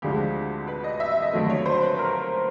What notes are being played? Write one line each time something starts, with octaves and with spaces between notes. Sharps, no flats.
D2 D3 F3 G#3 G4
B4
D#5
E5
E5
D#5
D#2 D3 F#3 A3
C#5
C5
B4
A#4